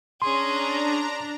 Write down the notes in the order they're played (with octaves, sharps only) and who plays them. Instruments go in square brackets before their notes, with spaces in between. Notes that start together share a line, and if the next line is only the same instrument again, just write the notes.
[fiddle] C#4 G#4 [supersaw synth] D4 A#5 [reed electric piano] C6